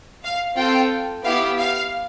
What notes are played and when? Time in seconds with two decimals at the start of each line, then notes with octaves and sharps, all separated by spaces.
0.24 F5
0.57 C4 F4 A4 G5
1.24 B3 E4 G4 F5
1.58 F5